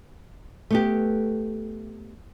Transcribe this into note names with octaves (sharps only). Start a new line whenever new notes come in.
A3 B3 G4